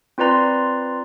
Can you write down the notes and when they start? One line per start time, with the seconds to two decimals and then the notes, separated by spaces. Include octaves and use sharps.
0.18 C4 F4 B4 D5 A#5 C6